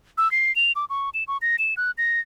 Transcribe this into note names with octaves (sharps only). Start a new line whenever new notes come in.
E6
C7
F7
D6
C#6
E7
C#6
A#6
E7
F#6
A#6